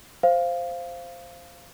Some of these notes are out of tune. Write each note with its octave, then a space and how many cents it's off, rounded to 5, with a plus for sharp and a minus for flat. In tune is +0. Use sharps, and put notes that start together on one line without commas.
C5 +0 F5 -10